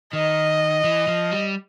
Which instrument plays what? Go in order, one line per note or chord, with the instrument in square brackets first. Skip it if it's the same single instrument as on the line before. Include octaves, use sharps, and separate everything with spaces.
[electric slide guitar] D#3 [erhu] D#5
[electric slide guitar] E3
F3
G3